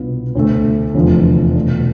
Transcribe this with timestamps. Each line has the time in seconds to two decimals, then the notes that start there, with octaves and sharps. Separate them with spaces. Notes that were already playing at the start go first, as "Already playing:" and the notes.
Already playing: C2 B2 B3 D4 F4
0.35 D2 D3 A3
0.95 F1 E2 D3 F3
1.55 B2 A3 D4